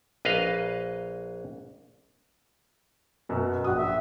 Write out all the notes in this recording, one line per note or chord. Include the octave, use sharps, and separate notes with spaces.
A#1 B4 D#5 F5
F#2 B2
A#1 F#4 D#6
E5